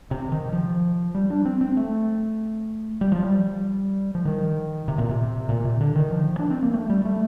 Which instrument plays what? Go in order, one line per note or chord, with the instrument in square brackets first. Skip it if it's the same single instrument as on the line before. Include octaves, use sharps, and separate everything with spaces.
[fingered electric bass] C3
D#3
F3
G3
D4
C4
C4
A3
G3
F3
G3
F3
D#3
C3
A#2
C3
A#2
C3
D3
D#3
F3
D4
C4
A#3
A3
G3
A3